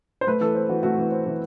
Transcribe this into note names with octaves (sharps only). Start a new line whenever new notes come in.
C5
A3 B4
E3 A4
C4
E3 F#4
A3 F#4
E3
C4
E3